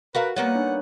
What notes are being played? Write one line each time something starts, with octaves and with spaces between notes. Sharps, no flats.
F#4 A#4 B4 F5
G3 A#3 B3 C#5 F#5
D4 D#4 C#5
F#6